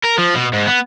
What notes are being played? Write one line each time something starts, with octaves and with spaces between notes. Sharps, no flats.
A#4
F3
B2
G#2
B3